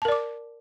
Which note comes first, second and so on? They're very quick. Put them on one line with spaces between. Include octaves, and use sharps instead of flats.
A5 A#4 D5 D6